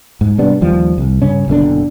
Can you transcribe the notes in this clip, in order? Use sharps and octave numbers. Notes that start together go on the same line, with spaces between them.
G#2
C3 G3 B3 D4
D#2 F3 G3
C2
G2 C#3 C#4
F#1 B2 D3 D4